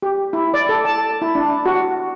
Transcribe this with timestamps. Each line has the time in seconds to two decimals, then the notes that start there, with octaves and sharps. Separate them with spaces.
0.02 G4
0.33 E4
0.54 D5
0.69 A4
0.85 A5
1.22 E4
1.35 D4
1.66 F#4